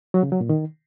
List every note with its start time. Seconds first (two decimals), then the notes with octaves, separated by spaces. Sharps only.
0.14 F#3
0.23 C#3
0.32 F#3
0.41 A#2
0.49 D#3